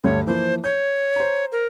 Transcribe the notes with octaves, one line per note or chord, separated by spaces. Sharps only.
D2 G2 C#5
E3 F3 A#3 C5
C#5 G6
C5 A#5
A#4